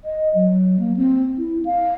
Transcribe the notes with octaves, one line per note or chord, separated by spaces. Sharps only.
D#5
F#3
A#3
C4
E4
F5